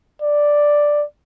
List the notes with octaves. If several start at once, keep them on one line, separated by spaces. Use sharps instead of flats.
D5